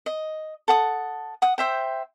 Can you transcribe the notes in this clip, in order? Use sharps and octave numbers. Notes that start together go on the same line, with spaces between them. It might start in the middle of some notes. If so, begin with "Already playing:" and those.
D#5
A4 F#5 D#6
F#5 D#6
C5 E5 G5